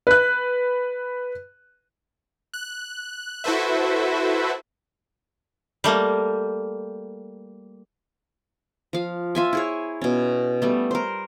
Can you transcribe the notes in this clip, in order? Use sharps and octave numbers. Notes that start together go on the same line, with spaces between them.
B4 F#6
F#6
E4 F#4 A4 B4 C5 E5
G3 A3 A#3
F3 F5
F4 E5 G#5
E4 G#4 C#5
B2 C#4
G3 A3 B3
A#4 C5